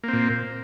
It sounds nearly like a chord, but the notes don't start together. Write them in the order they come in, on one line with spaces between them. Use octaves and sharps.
A#3 C4 A#2